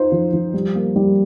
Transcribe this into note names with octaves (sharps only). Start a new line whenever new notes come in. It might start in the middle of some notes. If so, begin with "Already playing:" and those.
Already playing: D#4 F4 C5
F3
F3
G3
A#3
G3